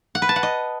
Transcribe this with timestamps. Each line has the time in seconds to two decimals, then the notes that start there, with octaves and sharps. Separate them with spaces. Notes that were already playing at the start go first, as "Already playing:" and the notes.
0.15 F#5
0.22 B4
0.29 A5
0.36 F#5
0.43 D#5